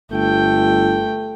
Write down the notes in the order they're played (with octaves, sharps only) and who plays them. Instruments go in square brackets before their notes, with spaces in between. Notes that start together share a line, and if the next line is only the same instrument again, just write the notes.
[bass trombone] G1 [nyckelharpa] A3 G5